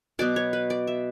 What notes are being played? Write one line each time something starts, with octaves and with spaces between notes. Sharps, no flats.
B2 F#3 B3 D5
C#5
B4
D5
E5